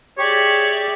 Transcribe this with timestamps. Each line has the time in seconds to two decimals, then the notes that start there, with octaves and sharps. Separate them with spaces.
0.18 G4 G#4 C#5 D5 E5